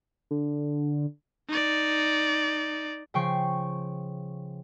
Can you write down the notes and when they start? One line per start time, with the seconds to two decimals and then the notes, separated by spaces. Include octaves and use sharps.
0.31 D3
1.49 D#4 D5
3.14 C#3 F3 G5 C#6 C7